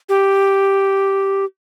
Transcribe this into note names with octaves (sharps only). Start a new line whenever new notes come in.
G4